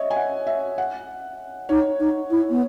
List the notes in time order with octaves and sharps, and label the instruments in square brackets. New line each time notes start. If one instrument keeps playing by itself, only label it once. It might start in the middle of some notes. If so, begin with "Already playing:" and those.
Already playing: [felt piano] C#5 D#5 E5
G#5
F#5
E5
F#5
[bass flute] D#4 [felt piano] C#5
[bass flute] D#4
E4
B3